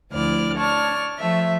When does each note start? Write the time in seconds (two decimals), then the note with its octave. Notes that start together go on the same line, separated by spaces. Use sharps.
0.10 D2 F3 E4 D5 F6
0.58 C#5 D5 A5 F6
1.18 F3 A3 E5